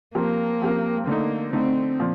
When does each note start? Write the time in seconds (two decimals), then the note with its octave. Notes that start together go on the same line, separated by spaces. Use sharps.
0.15 F3 A#3 C4 G4 A#4
0.61 F3 C4 G4 A#4
1.07 D3 A3 A#3 D#4
1.53 D3 A3 C4 D#4
1.99 A#2 F3